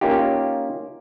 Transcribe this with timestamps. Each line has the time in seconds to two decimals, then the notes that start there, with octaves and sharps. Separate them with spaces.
0.01 A#3 C#4 D#4 F4 G4